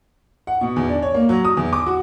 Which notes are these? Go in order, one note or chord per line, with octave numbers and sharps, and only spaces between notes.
F#5
B2
E2
D4
C#5
A#3
F#3
D#6
E2
D6
F#4